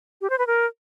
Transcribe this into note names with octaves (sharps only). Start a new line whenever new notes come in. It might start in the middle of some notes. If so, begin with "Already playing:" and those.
G4
C5
B4
A#4